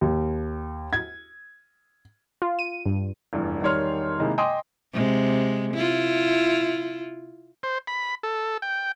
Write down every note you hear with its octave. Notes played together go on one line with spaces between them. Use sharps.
D#2
G#6
F4
D#7
G2
F1 E2 G2
E1 D#3 G3 C#5 C6 F6
C3 D#3 G#3 A#3 E4
D#5 G5 G#5 C6 D6 D#6
C3 G#3
E4 F4
C5
B5
A4
G5